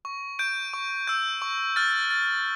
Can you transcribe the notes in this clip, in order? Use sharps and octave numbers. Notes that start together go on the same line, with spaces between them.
C#6
G6 D7
C#6
E6 G6
C#6
F6 A6
A6